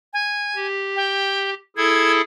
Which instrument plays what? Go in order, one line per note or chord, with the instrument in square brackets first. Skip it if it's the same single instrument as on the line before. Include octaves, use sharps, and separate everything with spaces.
[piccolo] G#5
[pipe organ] G4
[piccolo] G5
[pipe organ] E4 G#4 A4 [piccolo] G#6